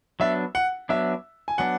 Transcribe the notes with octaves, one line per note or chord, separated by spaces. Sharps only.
F#3 B3 D4 E5
F#5
F#3 B3 D4 E5
G#5
F#3 B3 D4 F#5